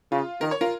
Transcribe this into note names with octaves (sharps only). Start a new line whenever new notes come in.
C#3 F4
D#3 A#4
C#5
F4 A#4